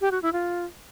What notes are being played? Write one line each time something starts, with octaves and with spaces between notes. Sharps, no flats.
G4
F#4
E4
F4